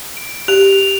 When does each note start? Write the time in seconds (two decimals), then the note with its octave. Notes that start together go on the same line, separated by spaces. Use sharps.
0.17 D7
0.48 G4 F7